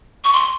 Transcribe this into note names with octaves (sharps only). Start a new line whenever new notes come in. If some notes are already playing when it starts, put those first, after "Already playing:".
C#6
C6